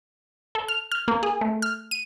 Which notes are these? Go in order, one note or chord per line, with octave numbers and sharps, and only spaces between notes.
A4
F6
F6
A#3
G#4
A3
F6
D#7